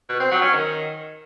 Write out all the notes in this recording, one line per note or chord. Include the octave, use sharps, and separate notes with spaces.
B2
C4
F#3
C#4
D#3